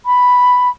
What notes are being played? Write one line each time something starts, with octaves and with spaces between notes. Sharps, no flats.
B5